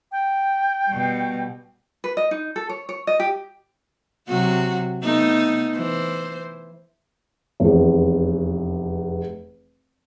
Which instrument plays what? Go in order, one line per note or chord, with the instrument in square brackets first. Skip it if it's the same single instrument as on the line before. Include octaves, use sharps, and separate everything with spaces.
[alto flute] G5
[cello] B2 G3
[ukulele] B4
D#5
D#4
A4
C#5
C#5
D#5
G4
[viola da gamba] C3 F#3 F#4
A3 B3 D#4
E3 C5
[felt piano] F1 E2